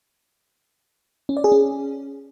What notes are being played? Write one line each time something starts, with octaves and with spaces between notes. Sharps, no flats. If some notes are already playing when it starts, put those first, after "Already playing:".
C#4
D5
G#4
C#4